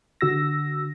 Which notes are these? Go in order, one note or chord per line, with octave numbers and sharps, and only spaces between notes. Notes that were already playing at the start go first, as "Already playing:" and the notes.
D3 F#4 E6 A#6